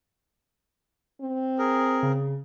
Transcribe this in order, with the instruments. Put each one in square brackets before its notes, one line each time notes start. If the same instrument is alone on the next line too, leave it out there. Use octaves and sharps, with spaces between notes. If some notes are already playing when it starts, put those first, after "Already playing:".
[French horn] C4
[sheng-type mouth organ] G#4 A#4
[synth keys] C#3